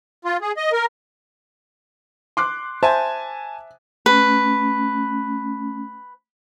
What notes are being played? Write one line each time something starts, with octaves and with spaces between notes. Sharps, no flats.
F4
G#4
D#5
A#4
C6 D6 F#6
C5 E5 G#5 A5
A3 C#4 B4